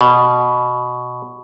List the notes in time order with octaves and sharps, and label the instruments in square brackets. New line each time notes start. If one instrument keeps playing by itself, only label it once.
[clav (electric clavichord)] B2